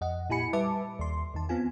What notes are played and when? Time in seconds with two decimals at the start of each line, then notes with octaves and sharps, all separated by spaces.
0.01 F2 D#5 F#5
0.30 A#2 E4 G4 G#5 B5 C#7
0.53 G3 B4 E5 A5 D6
0.99 D#2 C6
1.34 E2 D#3 A5
1.49 B3 C4 F4 G#5